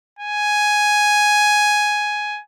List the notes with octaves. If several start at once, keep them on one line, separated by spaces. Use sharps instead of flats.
G#5